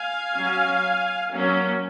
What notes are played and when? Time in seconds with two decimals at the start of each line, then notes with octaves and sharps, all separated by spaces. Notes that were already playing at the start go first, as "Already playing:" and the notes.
Already playing: F5 G#5
0.36 F#3 C#4
1.33 F#3 A#3 C#4